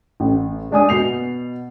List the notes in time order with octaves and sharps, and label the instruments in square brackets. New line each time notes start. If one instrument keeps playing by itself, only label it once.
[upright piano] A1
G#3 D4 G#5 D#6
B2 C7 F7